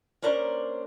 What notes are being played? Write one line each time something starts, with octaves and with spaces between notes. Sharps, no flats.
A#3 C#4 D4 A#4 C5